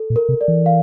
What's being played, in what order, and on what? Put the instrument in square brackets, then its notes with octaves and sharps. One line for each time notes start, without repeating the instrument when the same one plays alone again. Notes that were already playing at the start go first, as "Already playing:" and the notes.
Already playing: [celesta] A4
[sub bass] A#2
[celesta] A#4
[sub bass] C3
[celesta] D5
[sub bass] E3
[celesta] F5